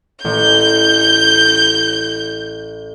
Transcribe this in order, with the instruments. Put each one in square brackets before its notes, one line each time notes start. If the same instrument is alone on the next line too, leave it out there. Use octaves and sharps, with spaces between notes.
[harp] A1 [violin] G6